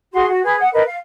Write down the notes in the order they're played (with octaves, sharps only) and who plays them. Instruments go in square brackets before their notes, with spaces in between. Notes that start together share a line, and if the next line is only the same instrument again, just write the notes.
[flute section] F#4 G#4 C6
F#4
G#4 B4
F#5 D#6
A#4 B4 D#5
F5